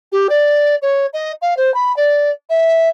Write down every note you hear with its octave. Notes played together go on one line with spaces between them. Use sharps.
G4
D5
C#5
D#5
F5
C5
B5
D5
E5